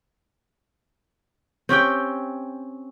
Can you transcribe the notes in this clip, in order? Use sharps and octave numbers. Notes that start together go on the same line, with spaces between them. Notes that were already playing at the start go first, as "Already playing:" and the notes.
C4 C#4 G4 G5